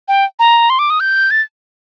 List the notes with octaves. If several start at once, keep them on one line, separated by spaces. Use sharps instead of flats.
G5
A#5
C6
D6
D#6
G6
A6